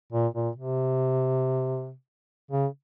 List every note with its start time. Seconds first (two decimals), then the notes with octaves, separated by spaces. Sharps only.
0.12 A#2
0.34 A#2
0.56 C3
2.51 C#3